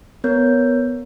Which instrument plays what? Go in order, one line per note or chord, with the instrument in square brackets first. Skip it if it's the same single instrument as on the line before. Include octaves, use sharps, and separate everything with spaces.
[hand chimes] B3 A#4 C#5 G6